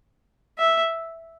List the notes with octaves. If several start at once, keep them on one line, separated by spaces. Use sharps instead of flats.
E5